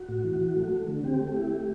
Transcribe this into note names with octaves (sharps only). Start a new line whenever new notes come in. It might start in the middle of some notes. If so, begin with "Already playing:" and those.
Already playing: F#4
A2
E3
E3
A3
A3
D3
C4 G4
A3
G4
E4
A3